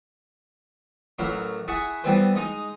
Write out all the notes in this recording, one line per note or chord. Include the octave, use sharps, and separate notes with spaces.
A1 F#3 E4 A#4 C6
E4 G#4 F#5 A5 B5 C#6
E3 G3 B3 C4 B4 C5
G#3 D#4 A#5 D#6